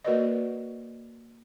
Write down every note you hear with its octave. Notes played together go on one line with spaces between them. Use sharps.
A#3 F#4 A#4 B4 D5 D#5